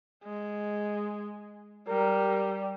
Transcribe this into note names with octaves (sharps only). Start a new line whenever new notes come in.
G#3
G3 A#4